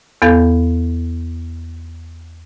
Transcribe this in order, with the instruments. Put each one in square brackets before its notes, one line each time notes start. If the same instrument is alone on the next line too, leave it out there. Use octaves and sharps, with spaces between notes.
[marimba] E2 B3 A4 F5 G6